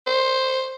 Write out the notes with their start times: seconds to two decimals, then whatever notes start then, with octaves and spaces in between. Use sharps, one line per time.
0.07 C5